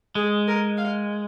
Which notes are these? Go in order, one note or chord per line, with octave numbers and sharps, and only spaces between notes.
G#3 G#4
A#4
F5